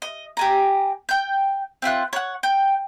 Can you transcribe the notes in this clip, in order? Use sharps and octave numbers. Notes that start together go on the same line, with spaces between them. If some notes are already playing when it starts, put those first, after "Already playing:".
D#5
G4 G#5 A#5
G5 G6
C4 E4 F4 F#6
C#5 F#5
G5